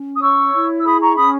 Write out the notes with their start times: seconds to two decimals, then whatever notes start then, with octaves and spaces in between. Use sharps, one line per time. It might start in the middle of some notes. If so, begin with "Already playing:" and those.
Already playing: C#4
0.15 D#6
0.20 C#5 C#6 E6
0.52 E4
0.79 E6
0.85 G#4 B5 D#6
1.01 A#5 C#6
1.17 C#4 B5 D#6